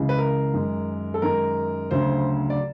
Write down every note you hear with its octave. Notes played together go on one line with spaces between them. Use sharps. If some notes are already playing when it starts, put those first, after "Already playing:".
Already playing: C#2 C#3 E3
B4
A#4
F#2 D#3 G#3
A4
F#2 D#3 G#3 A#4
D2 C#3 F#3 C5
D5